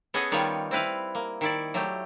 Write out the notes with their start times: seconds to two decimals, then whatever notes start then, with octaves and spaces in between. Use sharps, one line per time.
0.14 B3 C#4 G#4 A4 D#5 F#5
0.32 D#3 G3 B3 F4 C#5
0.71 C4 E4 B4 F5
1.15 A#3
1.41 D#3 E4 D5
1.74 F#3 A3 G4